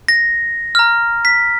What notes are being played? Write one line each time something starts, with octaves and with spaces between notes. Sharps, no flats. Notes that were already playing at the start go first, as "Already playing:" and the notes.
A#6
A#5 F6
B6